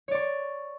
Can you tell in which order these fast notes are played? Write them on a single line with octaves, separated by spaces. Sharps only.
C#5 D5 C#6